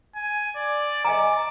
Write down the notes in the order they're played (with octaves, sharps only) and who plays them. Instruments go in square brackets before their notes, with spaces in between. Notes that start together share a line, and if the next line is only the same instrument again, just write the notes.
[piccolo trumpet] G#5
D5
[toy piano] D#5 G#5 A#5 [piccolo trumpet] D6